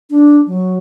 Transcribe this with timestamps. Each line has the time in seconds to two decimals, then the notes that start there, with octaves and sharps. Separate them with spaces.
0.10 D4
0.47 F#3